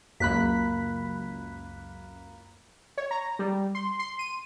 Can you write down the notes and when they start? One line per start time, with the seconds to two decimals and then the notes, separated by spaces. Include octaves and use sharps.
0.20 C#2 F#2 A#3 B5 F#6 B6
2.98 C#5
3.11 A#5
3.39 G3
3.75 C6
3.99 C6
4.19 D#7